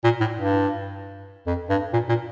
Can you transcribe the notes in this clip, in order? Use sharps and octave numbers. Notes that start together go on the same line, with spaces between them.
A#2
A2
G2
F2
G2
A#2
A#2